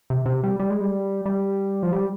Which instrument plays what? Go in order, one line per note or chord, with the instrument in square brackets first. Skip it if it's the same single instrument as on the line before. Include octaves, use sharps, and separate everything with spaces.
[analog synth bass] C3
C3
G3
G3
G#3
G3
G3
F3
G3